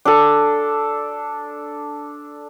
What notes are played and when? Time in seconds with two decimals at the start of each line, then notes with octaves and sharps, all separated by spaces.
0.05 D4 A4